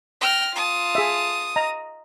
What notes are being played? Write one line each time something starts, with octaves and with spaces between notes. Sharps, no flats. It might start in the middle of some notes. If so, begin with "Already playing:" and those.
G5 F6 A#6
F4 A5 D#6
G#4 E5
D#5 A#5